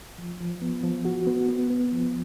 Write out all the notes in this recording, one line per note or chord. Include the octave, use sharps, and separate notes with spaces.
F3
F3
B3
F3
F#4
B3
B3
B3
F3